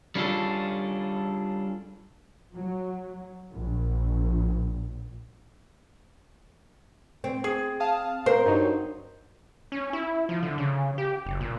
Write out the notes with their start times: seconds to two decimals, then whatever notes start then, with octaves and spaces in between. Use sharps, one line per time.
0.15 G3 C#4 D4 F4 G#4 A4
2.54 F#3
3.53 A#1
7.24 C4
7.44 G#4
7.80 F5 A5 D#6
8.26 A#4 C5
8.45 G2 F#3 D#4
9.72 C#4
9.93 E4
10.29 F3
10.43 D3
10.58 C#3
10.98 G4
11.26 F#1
11.40 A#2